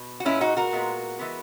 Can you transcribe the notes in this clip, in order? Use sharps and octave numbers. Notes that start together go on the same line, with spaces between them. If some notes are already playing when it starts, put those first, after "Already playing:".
Already playing: B2
F#4
A#2 G#3 B3 C#4 E4
D#4 F#4
F#4 A#4
A#2 G#3 B3
E3 G#3 B3